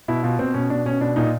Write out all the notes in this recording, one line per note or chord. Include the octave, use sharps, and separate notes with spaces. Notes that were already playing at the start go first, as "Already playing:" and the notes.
B2 E4
B2 F4
B2 C4
B2 C#4
B2 D4
B2 C#4
B2 D4
A#2 D#4